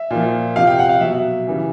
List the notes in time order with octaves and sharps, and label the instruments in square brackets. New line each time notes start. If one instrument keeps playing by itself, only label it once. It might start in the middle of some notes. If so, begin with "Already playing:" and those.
Already playing: [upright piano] E5
A#2 F3
C3 F3 F5
G5
F#5
F5
B2 F#3 E5
C#3 E3 G3